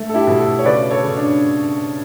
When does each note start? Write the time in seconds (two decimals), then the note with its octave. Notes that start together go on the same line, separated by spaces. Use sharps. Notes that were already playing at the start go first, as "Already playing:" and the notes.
Already playing: A3
0.09 A4
0.14 E4 G4
0.27 B2
0.39 F#4 A4
0.59 C#5
0.65 C#3 B4 D5
0.90 A4 C#5
1.03 C#3
1.16 D4